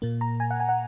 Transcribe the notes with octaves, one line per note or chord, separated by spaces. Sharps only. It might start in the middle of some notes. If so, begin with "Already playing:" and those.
A#2 A#3
A#5
G#5
F#5
G#5
F#5